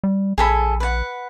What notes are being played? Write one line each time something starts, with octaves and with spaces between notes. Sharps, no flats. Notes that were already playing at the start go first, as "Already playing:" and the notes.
G3
A#1 G#4 A4 B5
B4 F#5